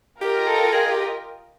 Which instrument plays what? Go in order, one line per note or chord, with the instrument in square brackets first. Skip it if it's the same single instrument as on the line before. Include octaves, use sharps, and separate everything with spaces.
[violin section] F4 A#4 D#5 G5 [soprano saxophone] G4
[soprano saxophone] A4
G#4
G4